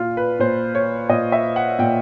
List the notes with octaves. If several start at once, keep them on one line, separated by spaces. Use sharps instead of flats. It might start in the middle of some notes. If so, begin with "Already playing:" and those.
Already playing: A#2 F4
B4
A#2 C5
C#5
A#2 D#5
E5
F#5
A#2 G5